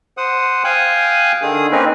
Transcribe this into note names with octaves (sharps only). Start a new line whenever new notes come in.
C5 F#5 D#6
F5 G5 G#5 D#6 F#6
D3 D#3 G#4 D#6
A#3 C4 C#4 D#4 A#4 B4